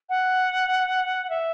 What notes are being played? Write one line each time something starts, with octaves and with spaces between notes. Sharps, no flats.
F#5
E5